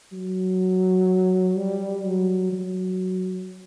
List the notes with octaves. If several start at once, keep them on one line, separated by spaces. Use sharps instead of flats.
F#3
G3
F#3
F#3